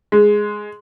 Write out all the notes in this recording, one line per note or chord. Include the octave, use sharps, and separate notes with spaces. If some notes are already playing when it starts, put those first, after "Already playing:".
G#3